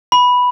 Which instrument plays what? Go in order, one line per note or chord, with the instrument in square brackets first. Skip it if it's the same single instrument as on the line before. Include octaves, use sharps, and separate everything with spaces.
[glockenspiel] B5